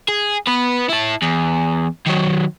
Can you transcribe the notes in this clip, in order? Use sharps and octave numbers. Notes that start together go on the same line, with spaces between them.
G#4
B3 B4
E4 A5
E2
D#3 F#3